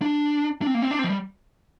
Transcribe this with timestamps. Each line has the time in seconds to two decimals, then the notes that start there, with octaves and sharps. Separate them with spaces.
0.02 D4
0.62 D4
0.67 C4
0.74 A#3
0.82 C4
0.91 D4
0.99 C4
1.04 F3
1.10 G3